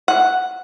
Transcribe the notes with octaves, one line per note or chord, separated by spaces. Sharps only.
F#5